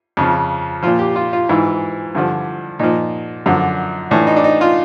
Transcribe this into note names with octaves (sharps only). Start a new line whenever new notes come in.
F2 C#3 F3
A#2 F3 F4
G4
F4
F4
G#2 E3 E4
G2 D3 F3
A#2 F3 D#4
F#2 D3 F3
A2 E3 D4
D#4
D4
D#4
F4